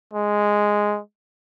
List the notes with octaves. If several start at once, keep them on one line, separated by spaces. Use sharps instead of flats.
G#3